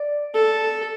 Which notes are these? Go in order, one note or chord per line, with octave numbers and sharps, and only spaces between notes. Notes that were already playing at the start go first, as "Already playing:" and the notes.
Already playing: D5
A4